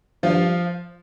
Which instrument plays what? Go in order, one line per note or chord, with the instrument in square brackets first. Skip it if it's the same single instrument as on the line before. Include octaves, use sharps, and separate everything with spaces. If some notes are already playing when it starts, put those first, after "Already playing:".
[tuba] G2 [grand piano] F3 F4